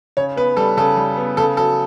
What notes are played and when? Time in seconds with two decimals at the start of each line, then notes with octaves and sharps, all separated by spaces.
0.17 C#3 C#5
0.36 B3 B4
0.57 G3 A4
0.77 C#3 A4
0.97 G3
1.17 B3
1.37 C#3 A4
1.57 F#3 A4